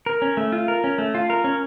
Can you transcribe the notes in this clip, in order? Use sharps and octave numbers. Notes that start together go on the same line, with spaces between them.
A#4
C#4
A3
F4
A#4
C#4
A3
F4
A#4
C#4